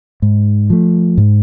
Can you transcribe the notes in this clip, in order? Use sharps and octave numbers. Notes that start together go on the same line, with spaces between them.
G#2
F3 A3
G#2